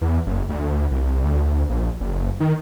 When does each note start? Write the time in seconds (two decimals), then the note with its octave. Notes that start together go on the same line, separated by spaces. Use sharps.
0.01 E2
0.26 F#1
0.49 D2
0.91 C2
1.25 D2
1.70 A#1
2.01 F#1
2.40 D#3